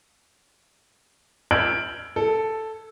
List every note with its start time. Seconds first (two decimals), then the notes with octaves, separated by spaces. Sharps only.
1.51 E6 F6 G6 G#6 D7 F#7
2.16 A4